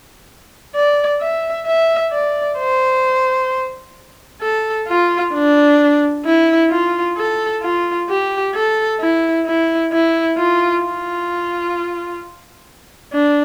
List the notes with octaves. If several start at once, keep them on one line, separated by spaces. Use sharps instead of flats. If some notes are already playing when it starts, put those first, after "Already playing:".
D5
E5
E5
D5
C5
A4
F4
D4
E4
F4
A4
F4
G4
A4
E4
E4
E4
F4
F4
D4